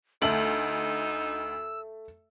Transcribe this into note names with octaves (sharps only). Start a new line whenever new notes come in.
D2 A3 D#4 E5 A5 E6 F#7